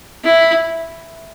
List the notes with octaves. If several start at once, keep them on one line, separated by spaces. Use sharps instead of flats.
E4